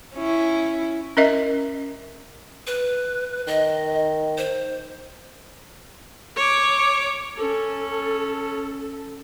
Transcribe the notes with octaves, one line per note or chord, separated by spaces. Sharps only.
C#4 E4
C#4 A#4 D#5 E5
B4
D#3 D#5
C5
C#5 D6
C#4 A4